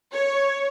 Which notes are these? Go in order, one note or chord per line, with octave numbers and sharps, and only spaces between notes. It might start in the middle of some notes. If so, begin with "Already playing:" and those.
C#5